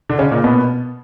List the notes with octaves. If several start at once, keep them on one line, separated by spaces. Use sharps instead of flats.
D3 D4
C#3 C#4
A#2 A#3
B2 B3